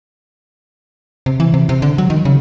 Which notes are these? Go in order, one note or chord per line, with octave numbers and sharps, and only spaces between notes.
C3
E3
C3
C3
D3
F#3
D#3
C#3